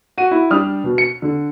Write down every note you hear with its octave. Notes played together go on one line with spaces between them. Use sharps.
F#4 D#7
E4
G3 D4 D#6 F6
B2
C#7
D3